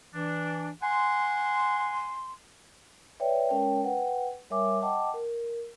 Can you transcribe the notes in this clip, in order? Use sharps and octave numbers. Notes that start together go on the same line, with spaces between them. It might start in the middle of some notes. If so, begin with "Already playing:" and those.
E3 D4
F#5 G#5 C6
B4 C#5 D5 E5 G5
G#3 C#4 A#4 C#5 G5 A5
B4 F#5 G5
G3 A#4 C#5 E5 G#5 D6
D#5 F#5 G5 A5 D6
A#4